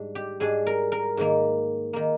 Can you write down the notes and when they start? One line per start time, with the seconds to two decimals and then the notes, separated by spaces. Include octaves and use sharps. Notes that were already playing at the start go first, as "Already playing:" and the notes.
Already playing: G#2 G3 D4
0.15 G4
0.40 G#2 G3 D4 G#4
0.67 A#4
0.92 A#4
1.17 G#2 D#3 A#3
1.93 D#3 A#3